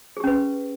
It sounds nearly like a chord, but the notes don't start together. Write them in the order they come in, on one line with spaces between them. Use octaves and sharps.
G#4 G4 C#4 B4